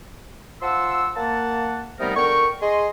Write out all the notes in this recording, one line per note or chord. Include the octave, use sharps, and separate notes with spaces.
F3 F#5 A5 C6 E6
A#3 F#5 A5
C3 G3 A3 B3 D#4 A#4
D3 A#4 G5 C#6
G#4 D#5 C6